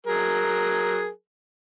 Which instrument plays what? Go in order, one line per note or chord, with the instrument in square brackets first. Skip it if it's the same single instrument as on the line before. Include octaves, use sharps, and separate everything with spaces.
[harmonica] F#3 G#4 A#4